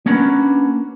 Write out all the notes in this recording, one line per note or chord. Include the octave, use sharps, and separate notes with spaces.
A#3 C#4 D4 F#4 A#4 B4